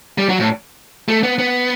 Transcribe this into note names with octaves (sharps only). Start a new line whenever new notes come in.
G3
F#3
A2
A3
B3
B3